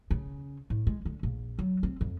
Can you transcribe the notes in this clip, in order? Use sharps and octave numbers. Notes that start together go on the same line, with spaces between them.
C#3
A2
G#3
D3
A#1
F#3
C4
F2